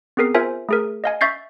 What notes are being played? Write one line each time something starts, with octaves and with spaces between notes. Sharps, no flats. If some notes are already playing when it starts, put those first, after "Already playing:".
B3 C4 G#4 A#4 C7
F4 A#4 C5 E5 G#5
A3 G#4 A#4
D#5 F5 G#5
E5 C#6 G6 A6 C7